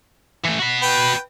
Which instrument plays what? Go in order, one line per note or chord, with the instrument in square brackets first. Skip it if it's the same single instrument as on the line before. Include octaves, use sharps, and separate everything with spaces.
[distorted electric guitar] E3 A3
F#4 B5
[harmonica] B4 G5